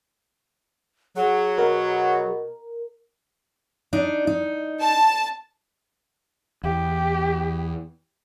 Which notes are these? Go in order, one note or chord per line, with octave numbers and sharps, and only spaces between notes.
F#3 G#4
B2 A#4
D4 D#4
D#4
A5
E2 G4